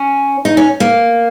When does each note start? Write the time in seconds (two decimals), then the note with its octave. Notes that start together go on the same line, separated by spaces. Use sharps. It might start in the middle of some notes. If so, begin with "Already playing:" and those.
Already playing: C#4
0.45 D#4
0.57 C#4
0.80 A#3